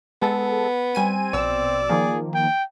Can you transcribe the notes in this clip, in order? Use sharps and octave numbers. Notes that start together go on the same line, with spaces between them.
G#3 B3 A4
G3 C4 G#5 D#7
A#1 B2 D5 E6
D#3 F3 A#3 G#4
G5